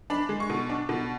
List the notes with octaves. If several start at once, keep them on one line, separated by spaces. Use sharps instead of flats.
D4 B5
G#3
C#6
B2
D4
B2